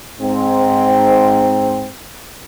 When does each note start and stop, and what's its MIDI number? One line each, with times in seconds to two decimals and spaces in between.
0.20 1.89 44
0.20 1.89 60